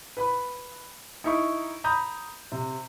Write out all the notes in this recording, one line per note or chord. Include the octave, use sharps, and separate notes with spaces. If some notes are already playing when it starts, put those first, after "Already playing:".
B4 B5
D#4 E4 C#6
A#5 B5 D#6 G6
C3